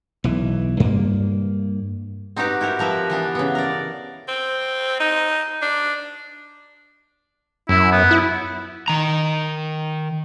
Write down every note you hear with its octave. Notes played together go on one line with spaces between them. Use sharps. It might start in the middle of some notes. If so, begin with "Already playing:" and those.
B1 E3
G2 A#3
C4 D#4 F#4 G4 B4
E4 F#4 G4 A#4
F3 A#4 B4 E5
E3 B3 D4
C#3 B3
A#4 D5
C4
D#4
D4
F#2 E4
B3
E4
D#3 A#5